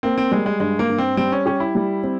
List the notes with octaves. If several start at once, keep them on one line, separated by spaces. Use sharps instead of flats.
A#3 C4
C4
G3 G#3
G#3
G2 G#3
A#3
G2
C4
G3 C4
C#4
C#4 G4
E4
G3
C4